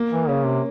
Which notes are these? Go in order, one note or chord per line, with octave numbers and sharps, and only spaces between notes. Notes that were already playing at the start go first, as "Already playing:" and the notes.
Already playing: A#3
E3
C#3 C#4
C3